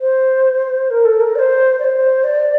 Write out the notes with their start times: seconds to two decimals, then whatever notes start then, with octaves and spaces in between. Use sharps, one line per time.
0.01 C5
0.91 A#4
1.05 A4
1.20 A#4
1.36 D5
1.39 C5
1.80 D5
1.85 C5
2.24 D5